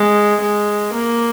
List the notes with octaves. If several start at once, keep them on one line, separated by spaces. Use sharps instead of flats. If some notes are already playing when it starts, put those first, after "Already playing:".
Already playing: G#3
G#3
A#3